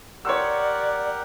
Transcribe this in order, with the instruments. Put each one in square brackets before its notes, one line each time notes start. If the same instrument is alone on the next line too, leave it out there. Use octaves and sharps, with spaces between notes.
[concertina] G4 A#4 F#5 [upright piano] C#5 C6 E6 [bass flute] D5